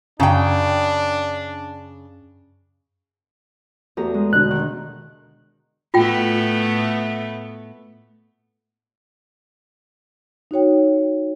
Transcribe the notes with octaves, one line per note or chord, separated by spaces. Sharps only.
F#2 C#3 D4 G5 A#5
E2 A3 F#4 G4 A#5
G#3
B2 D3 F#6
D#3
A2 A3 B3 F4 G5
D#4 F#4 C#5 G5